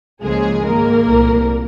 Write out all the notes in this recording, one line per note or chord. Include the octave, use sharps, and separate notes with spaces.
C#2 C#3 F3 G#3 A#3 G#4
G#2 D#3 G#3 A#3 A#4
C2 A#2 F3